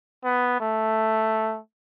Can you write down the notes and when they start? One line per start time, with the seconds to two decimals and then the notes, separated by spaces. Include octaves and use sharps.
0.24 B3
0.60 A3